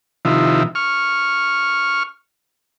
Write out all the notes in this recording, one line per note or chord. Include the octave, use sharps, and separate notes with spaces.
C3 D#3 F3 E4
C#6 F6